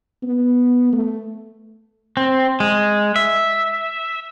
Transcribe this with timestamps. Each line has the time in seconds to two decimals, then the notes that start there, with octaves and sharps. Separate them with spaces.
0.23 B3
0.93 A3
2.17 C4
2.60 G#3
3.16 E5